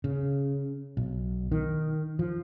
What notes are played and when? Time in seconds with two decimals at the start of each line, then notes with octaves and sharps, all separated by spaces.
0.04 C#3
0.97 B1
1.52 D#3
2.19 F3